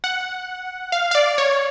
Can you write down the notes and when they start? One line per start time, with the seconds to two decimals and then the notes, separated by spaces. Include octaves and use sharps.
0.04 F#5
0.92 F5
1.11 F5
1.15 D5
1.38 C#5